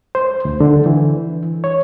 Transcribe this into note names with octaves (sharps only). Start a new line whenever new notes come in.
C5
D2
D3
E3
C#5